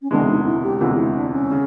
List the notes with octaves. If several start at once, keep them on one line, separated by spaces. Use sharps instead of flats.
C#4
E1 D2 C3 E3 G#3 D4
D#4
E4
G4
E1 D2 C3 E3 G#3 F4
E4
D4
C#4
C#3